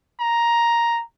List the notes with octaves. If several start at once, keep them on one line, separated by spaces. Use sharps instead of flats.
A#5